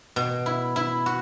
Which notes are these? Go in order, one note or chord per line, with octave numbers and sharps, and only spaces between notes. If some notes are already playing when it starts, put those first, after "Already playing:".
B2
E4
E4
F#4